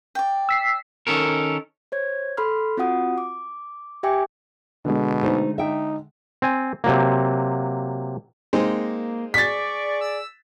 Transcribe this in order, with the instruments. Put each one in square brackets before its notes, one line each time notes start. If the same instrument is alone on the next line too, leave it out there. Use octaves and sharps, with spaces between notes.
[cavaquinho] D5 G5
[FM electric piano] E6 B6 C7
[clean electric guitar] D#3 C#4 A4 A#4
[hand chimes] C5 C#5 G#6
A4 B5 C6 F6
C4 F4 F#4 F#5 D#6
D6
G4 E5 G5 G#5 D6
[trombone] B2 [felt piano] D3 G#3
[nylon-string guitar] A3 D#4 C5
[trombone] D#4 [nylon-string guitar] E5 G5
[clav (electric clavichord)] C4 G#5
C3 F#3 A#3
[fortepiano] G#3 C4 D#4 [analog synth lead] A#3
[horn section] G#4 D5 [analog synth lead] C#6 [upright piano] A6 B6
[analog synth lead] E6